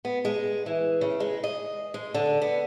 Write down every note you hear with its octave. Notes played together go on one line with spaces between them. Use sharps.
B3
G#3
E3
C#3
G#3
D#5
G#3
D3
B3